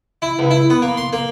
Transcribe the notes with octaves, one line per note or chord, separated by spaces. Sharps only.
E4
C#2
E4
B3
A#3
C6
A#3